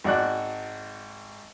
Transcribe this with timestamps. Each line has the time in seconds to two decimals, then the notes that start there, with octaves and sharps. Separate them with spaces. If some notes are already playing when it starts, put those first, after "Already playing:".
0.04 G#1 F#4 D5 F#6